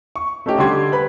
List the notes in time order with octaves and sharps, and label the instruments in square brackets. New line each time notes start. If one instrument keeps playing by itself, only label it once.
[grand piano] C#6
A3 C#4 D#4 G4
D3 G3 G4 C6 G#6
B4 B5